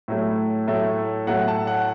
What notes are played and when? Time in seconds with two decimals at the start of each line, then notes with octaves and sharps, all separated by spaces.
0.08 A2 F#3 A3
0.67 A2 F#3 A3
1.27 A2 F#3 A3 F#5
1.48 A5
1.67 F#5